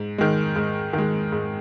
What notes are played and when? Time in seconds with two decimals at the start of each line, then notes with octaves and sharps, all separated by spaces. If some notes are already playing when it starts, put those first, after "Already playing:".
Already playing: G#2
0.18 D#3 G#3
0.56 G#2
0.93 D#3 G#3
1.32 G#2